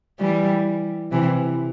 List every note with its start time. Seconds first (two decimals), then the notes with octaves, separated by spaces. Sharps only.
0.20 E3 G3
1.12 C3 E3